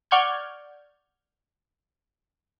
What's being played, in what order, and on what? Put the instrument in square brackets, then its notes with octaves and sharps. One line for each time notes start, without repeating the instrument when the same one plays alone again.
[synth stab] D5 F#5 C#6 F6 G6 G#6